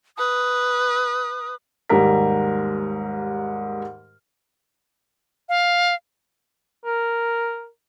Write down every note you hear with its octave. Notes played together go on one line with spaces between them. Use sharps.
B4 D#6
D#2 G#2 G3 A#4 B6
F5
A#4